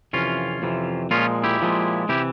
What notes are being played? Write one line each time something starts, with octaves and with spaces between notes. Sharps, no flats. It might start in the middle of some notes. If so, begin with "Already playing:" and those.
F2 C3 E3 C#4 F4
F2 C3 E3
A#2 F3 G#3 C#4 F4
E4 G4
A#2 F3 G#3
C3 E3 E4 G4